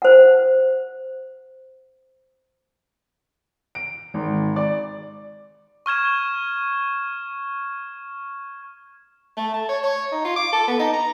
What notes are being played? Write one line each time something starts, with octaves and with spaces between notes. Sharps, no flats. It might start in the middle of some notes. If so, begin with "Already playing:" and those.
C5 F#5
D7
G#1
D5
C#6 F6 G#6 E7
A3
A5
C#5
C#5
D#4
F4
D6
A4
B3
D#4
A#5